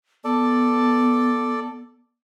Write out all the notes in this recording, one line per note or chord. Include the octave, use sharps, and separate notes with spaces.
B3 A4 D5